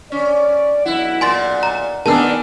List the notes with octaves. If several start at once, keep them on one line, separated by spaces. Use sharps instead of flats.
C#4 D5
B1 E4 D#5 F#5
A#2 G#5 C6 A6
A#5
D#3 B3 D4 G#4 A#4 A5 E6